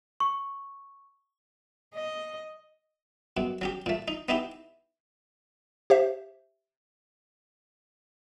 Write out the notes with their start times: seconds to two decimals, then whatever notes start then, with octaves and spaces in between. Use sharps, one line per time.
0.20 C#6
1.95 D#5
3.37 F#2 B2
3.61 F#3 C#4 G4
3.86 A#2 A3
4.08 D#4
4.29 B3 D#4 E4 G4
5.90 G4 C5 E5